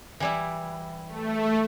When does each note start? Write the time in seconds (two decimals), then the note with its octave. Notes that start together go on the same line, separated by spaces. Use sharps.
0.20 E3 G3 E4
1.09 A3